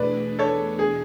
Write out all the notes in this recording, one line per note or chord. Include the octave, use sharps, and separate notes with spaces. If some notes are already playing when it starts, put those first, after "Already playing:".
Already playing: E2 B2 A3 D4 G#4 B4 D5
A4 C#5
G#4